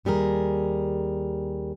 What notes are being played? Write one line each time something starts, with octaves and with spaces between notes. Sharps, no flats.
D#2 G3 G#4 A#4